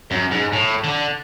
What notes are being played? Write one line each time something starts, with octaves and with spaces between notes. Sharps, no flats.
F#2
G#2
A2
D3